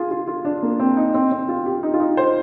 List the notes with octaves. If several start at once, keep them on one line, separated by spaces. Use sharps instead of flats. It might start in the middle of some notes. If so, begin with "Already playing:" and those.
Already playing: F4 G#4
F4
F4
D4
A#3
C4
D#4
C4
C4
F4
G4
D#4
F4
D#4
C5